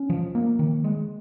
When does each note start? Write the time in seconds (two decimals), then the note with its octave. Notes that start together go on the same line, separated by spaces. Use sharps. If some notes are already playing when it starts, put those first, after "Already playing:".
Already playing: C#4
0.10 F3
0.35 A#3
0.59 D#3
0.84 G#3